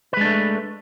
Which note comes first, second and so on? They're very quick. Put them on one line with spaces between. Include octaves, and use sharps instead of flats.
B4 G#3 D4 A3